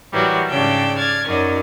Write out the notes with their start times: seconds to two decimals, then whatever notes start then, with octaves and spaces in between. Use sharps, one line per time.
0.12 A2 E3 F#3 G3 F#4 A#4
0.49 G#2 C#3 D4 D5 G5 E6
0.97 D5 F6 G#6 A6
1.26 F#2 F#3 C#4 D#4 A#4 D5